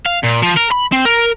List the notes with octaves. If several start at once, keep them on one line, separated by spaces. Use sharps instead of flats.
F5
A#2
F3
A#4
B5
C4
A#4